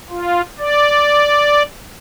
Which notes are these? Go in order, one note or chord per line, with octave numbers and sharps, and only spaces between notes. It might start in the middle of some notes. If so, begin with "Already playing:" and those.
F4
D5